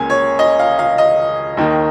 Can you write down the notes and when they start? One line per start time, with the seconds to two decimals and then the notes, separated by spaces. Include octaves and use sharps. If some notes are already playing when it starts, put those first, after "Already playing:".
Already playing: C#2 C#3 A#3 C#4 G#5
0.10 C#5
0.39 D#5
0.59 F5
0.79 F5
0.98 D#5
1.57 D#2 D#3 A#3